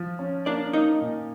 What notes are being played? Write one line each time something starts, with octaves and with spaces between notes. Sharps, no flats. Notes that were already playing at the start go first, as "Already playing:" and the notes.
Already playing: F3
C#4
A#3 D4 D5
A#3 D#4 D#5
A#2